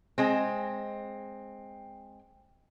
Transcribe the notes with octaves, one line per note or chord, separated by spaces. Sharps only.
G#3 C4